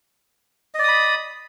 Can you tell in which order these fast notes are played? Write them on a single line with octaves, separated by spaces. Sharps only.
D#5 D5 D#6 B5